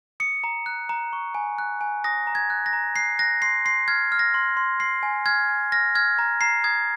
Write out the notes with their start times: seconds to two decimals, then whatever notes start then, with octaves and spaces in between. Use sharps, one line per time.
0.20 D#6 C#7
0.44 A#5
0.66 F#6
0.89 A#5
1.13 C#6
1.35 G#5
1.58 F#6
1.81 G#5
2.04 D#6 A#6
2.27 A#5
2.35 G#6
2.50 F#6
2.66 A#6
2.73 A#5
2.96 F#6 C7
3.19 F#6 A#6
3.42 C6 C7
3.65 C6 C7
3.88 F6 G#6
4.12 F6
4.19 A#6
4.34 C6
4.57 C6
4.80 C6 C7
5.03 G#5
5.26 F6 G#6
5.49 G#5
5.72 F6 A#6
5.95 F6 G#6
6.19 A#5
6.41 A#5 C7
6.64 D#6 G#6